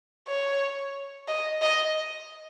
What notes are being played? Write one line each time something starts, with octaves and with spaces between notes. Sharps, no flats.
C#5
D#5
D#5